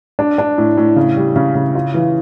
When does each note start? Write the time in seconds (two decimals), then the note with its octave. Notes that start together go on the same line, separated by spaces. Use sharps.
0.19 D4
0.38 D4
0.58 A2
0.77 A2
0.96 C#3
1.16 G3
1.36 C#3
1.55 C#3
1.75 F4
1.94 E3